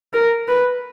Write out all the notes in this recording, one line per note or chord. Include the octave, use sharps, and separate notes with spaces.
A#4
B4